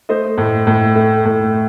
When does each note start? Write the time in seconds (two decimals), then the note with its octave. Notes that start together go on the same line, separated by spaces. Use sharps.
0.09 A3 C5 D#5
0.38 A2
0.67 A2
0.96 A3
1.25 A2